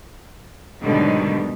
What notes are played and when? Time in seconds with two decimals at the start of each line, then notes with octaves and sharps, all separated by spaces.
0.80 G#2 B2 D3 D#3 F#3 G3